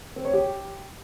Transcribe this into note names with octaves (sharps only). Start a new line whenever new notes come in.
C4
C#5
G4